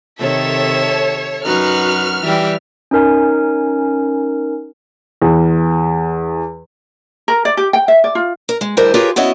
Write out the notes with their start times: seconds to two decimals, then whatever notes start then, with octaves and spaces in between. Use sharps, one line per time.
0.19 C3 D#3 A4 C#5 E5 E7
1.45 F#2 D#4 F#4 B4 F6
2.24 E3 G3 G4 E5
2.91 C#4 D#4 A#4 G#5
5.22 E2
7.28 A#4
7.45 D5
7.57 G4
7.73 G5
7.88 E5
8.04 D5
8.15 F4
8.49 A#4
8.61 G#3
8.77 D2 G3 E4 A#4 C5 D#5
8.94 F4 G4 G#4 A#4 B4 C#5
9.16 B3 C#4 E4 F#4 C#5 D#5